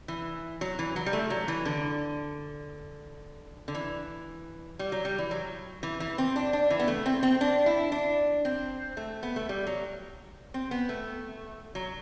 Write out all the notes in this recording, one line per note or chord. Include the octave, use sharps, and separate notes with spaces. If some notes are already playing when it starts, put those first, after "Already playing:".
E3
F#3
E3
F#3
G3
A3
F#3
E3
D3
D3
E3
G3
F#3
G3
E3
F#3
E3
E3
C4
D4
D4
E3
B3
A3
C4
C4
D4
E4
D4
C4
A3
B3
A3
G3
F#3
C4
B3
A3
F#3